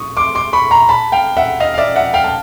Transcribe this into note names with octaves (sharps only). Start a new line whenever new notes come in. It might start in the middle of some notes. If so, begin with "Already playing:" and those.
Already playing: C#6 D#6
C6 D6
C6 D6
B5 C#6
A#5 C6
A5 B5
F5 G5
E5 F#5
D#5 F5
F5
D5 E5
E5 F#5
F5 G5
A5